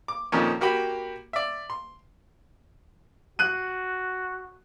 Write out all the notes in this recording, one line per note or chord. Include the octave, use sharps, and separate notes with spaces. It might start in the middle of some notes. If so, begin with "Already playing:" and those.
D6
F2 A#2 D#3 F3 C#4
A#3 F#4 G4 G5 B5
D5 E5
C6
F#4 F#6 D#7